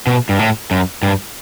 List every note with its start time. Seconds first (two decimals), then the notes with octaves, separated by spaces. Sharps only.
0.07 B2
0.29 G2
0.39 A2
0.71 F#2
1.03 G2